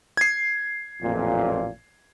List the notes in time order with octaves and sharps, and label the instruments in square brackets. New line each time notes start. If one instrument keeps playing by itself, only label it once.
[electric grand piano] G#6 C7
[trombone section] A1 F2 A#2